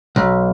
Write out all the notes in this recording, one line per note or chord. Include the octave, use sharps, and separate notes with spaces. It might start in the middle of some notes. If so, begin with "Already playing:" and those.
B1